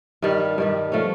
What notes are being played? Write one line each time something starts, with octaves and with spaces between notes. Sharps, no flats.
G2 D#3 G3
G2 D#3 G3
F3 A3 C#4